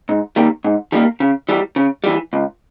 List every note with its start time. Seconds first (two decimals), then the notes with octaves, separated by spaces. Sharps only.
0.09 G#2
0.36 D#3 G3 A#3
0.64 G#2
0.92 D#3 G3 A#3
1.20 C#3
1.49 E3 G3
1.76 C#3
2.04 E3 G3
2.33 C#2